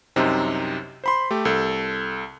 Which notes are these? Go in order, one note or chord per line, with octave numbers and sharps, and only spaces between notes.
C2 F#2 C3 C4 D#4
C5 B5 C6
A3 G4
C2 A4